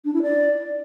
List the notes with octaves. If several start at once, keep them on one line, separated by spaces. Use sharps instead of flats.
D4
E4
D5